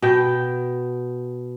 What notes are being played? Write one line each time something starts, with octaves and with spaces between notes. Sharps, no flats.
B2 G5